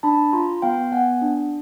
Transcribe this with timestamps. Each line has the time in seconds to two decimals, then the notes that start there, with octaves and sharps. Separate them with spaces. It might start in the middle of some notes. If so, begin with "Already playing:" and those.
0.03 D4 A5 B5
0.33 F4 A#5 C6
0.62 B3 F5 G5
0.92 B3 F#5 G#5
1.22 D4